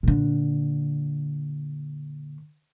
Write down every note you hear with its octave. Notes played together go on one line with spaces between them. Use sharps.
A#2 D3